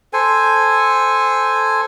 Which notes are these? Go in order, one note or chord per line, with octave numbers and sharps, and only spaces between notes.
A4 C5 G#5